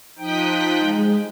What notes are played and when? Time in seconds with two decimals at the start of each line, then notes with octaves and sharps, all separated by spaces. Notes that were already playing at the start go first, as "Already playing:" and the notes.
0.18 F3 D#4 G5 D#6 F#6 B6
0.79 G#3